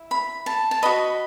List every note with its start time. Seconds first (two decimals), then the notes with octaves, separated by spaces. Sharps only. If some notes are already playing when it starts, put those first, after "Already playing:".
Already playing: E4
0.11 B5
0.46 A5
0.71 A5
0.83 F#4 B4 D#5 B5